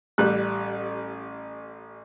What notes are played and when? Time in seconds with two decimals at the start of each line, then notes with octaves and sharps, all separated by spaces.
0.18 A1 G3 F#6